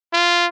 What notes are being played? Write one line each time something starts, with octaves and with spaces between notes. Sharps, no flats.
F4